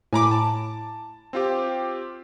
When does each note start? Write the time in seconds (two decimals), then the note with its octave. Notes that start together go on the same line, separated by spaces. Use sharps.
0.13 A2 G#5 A#5 B5 D6
0.31 A5
1.33 C4 F4 G4